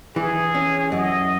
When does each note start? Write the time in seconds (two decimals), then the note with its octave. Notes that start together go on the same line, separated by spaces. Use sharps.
0.16 E3 G#4
0.55 C#4
0.91 F#2 D#5